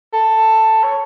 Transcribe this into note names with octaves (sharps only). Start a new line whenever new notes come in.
A4
C#5